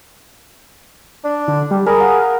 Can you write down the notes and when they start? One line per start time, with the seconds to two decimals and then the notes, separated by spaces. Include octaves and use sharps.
1.24 D4
1.48 D3
1.71 G3
1.87 G#4 A#4 B5 D#6
2.00 F5 F#5